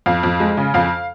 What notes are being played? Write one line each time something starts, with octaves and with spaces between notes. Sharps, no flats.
F2 F5
F2
G#3
C#3
F2 F5